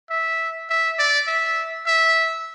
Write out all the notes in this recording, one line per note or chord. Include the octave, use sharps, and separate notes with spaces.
E5
E5
D5
E5
E5